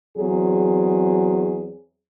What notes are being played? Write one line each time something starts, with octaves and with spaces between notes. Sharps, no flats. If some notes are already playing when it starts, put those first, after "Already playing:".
E2 F#3 C4 G#4